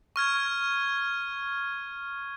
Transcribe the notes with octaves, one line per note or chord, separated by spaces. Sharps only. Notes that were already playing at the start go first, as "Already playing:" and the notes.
C#6 F6 G#6